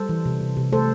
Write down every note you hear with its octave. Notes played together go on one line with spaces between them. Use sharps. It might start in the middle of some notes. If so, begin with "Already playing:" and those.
Already playing: G3 A4 C5
E3
C3
C3
C3
A3 A4 C5